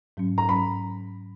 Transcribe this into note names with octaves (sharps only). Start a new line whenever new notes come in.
G#2 F#3 C#4
A#5
G#2 F#3 C#4 B5